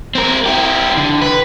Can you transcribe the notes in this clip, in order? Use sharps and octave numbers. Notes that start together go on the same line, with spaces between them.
C4 A#4
E4 G4
D3
B4